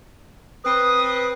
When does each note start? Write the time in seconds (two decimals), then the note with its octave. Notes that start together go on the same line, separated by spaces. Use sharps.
0.64 C4 B4 D#6